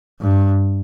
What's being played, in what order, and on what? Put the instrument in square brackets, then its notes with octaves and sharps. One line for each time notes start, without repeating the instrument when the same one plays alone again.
[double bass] G2